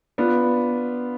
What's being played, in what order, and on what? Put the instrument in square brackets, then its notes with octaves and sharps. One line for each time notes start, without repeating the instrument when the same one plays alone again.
[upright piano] B3 D4 F4